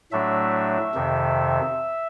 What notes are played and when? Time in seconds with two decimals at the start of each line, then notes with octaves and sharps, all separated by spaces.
0.12 A2 F#3 A3 D4 E5
0.95 F2 C3 D#3